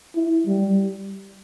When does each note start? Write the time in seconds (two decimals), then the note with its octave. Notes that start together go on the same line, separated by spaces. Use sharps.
0.16 E4
0.47 G3